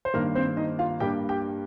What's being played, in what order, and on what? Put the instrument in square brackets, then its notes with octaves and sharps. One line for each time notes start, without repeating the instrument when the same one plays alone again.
[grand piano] C5
G2 D#3 A#3 A#4
C4 C5
D#4 D#5
F4 F5
G2 G3 A#3 G4 G5
G4 G5